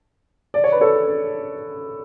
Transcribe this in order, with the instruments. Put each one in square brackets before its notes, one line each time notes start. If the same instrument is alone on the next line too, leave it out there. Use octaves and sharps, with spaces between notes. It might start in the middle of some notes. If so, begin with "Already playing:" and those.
[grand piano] D5
C#5
B4
A4 C#5